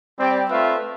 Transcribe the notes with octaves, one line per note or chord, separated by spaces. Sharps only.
G3 C4 G4 D5 G5
A3 C4 F4 B4 E5